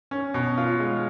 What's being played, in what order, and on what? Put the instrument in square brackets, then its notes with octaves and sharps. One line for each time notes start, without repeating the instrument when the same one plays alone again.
[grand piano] C#4
B2
F4
G#3